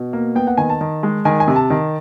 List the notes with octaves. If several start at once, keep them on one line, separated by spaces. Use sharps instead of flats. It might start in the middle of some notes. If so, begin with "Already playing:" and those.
Already playing: B2
A#3
B3 G5
F#5
D#3 G#5
A5
D#3
G#3
D#3 G#5
G#5
C3
A5
D#3